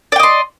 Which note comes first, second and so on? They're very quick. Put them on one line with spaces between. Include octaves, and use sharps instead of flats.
D5 G5 D#5 C6